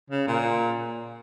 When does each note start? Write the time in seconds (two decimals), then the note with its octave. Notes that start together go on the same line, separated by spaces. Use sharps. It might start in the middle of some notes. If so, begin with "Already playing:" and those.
0.10 C#3
0.27 A#2